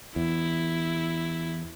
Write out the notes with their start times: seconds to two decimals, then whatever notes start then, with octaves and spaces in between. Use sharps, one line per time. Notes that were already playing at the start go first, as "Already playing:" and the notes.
0.16 E2 E4